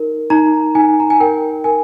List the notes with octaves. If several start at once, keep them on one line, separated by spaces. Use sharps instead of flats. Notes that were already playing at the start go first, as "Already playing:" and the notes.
Already playing: D#4 A#4
D#4 A#5
D#4 G#5
A#5
G#5
A#4 G5
A#4 G#5